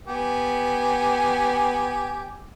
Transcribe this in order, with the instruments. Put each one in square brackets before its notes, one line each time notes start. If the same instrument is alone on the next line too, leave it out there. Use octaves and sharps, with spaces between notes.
[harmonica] B3 G4 G#5